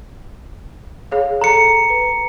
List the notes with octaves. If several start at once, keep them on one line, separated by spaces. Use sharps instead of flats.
G#4 C#5 F5
A4 A#5 C#7
B4